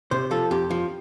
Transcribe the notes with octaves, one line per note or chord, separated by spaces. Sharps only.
C3 C5
F3 A4
F2 G4
F3